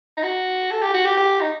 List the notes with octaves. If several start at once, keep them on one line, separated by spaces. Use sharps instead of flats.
D#4
F#4
A4
G4
F#4
G4
G4
D#4